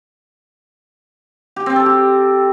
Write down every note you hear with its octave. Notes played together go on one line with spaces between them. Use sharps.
G4
C4
A4
G4